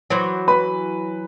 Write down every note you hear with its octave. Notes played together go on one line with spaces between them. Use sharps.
E3 F#3 C5 C6
B4 B5